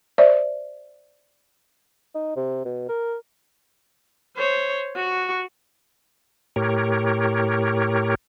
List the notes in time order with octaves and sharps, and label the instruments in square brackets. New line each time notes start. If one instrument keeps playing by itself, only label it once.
[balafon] C5 D5 E5
[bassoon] D#4
C3
B2
A#4
[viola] C5 C#5
F#4 C#6
[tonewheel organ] A2 G4 A#4 C#5